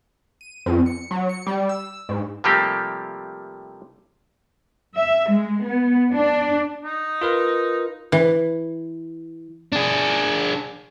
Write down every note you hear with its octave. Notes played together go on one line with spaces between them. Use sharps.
D#7
F2
C#7
F#3
C#7
G3
E6
G#2
C3 F3 G3 A3 A#3 G4
E5
G#3
B3
D4
D#4
F4 A#4 B4
E3
D4 G#4